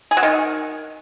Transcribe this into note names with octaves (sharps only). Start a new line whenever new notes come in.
G#4
F#3
D#3